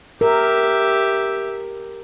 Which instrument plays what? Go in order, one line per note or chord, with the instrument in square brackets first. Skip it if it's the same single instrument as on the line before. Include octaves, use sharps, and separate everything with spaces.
[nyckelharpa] G4 E5 [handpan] A#4